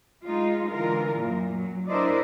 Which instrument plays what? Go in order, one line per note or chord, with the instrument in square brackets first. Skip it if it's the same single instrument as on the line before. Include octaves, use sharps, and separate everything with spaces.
[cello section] G#3 D#4 F4
D3 E3 F4 A#4
F#2 A#2
F#3
D4 E4 A#4 C5 D5 D#5